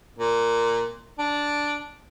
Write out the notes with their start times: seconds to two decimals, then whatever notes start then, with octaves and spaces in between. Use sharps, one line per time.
0.19 A#2
1.19 D4